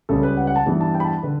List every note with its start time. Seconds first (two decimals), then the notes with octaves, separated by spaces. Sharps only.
0.09 C#2 C#3 G3 A4
0.23 B4
0.37 F#5
0.47 F#5
0.56 A5
0.66 G2 E3 G3 B3
0.81 A5
0.95 G5
1.00 B5
1.04 A5
1.23 D3 B4